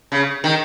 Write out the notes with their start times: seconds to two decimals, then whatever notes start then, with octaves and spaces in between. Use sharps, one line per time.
0.12 C#3
0.44 D#3